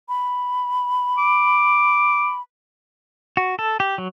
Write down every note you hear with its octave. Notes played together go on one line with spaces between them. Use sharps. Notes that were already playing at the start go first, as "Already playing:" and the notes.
B5
D6
F#4
A4
G4
F#3